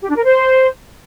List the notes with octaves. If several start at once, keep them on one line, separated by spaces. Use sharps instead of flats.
G4
D4
A#4
C5